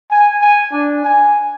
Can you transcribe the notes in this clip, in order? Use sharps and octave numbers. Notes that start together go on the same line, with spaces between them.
G#5
G#5
D4
G#5